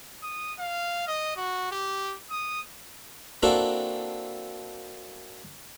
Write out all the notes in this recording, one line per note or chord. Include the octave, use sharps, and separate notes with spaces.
D#6
F5
D#5
F#4
G4
D#6
A#3 C4 D4 E4 F#4 A4